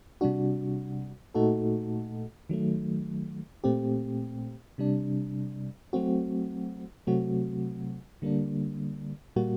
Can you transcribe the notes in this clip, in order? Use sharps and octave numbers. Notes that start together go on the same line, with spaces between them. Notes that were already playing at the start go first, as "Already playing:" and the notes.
C3 G3 D4 F#4
A#2 A3 D#4 F#4 A4
D#3 F#3 A3
A#2 A3 C4 G4
C3 G3 D4
F#3 A3 C4 F#4
C3 F#3 A3 C4 F#4
D3 G3 A#3 D4
A#2 G3 A#3 F#4